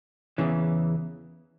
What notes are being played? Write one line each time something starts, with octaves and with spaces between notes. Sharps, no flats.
E2 C#3 E3